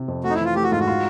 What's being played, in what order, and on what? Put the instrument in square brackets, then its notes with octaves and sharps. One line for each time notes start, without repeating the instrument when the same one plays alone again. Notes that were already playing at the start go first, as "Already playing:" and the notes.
Already playing: [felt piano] C3
F2
[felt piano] A3 [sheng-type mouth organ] F#4
[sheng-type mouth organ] D#4
E4
[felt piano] E3 [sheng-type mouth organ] F4
[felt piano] A3 [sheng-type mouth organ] G4
[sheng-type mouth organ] F#4
[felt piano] G#2 [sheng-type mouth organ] F4
[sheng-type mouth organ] F#4
[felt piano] F4